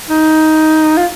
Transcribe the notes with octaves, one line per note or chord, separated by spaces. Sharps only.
D#4
F4